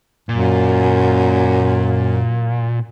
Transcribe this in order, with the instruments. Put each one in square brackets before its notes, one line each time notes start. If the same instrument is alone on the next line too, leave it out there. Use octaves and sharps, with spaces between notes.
[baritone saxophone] F#2 [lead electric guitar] A#2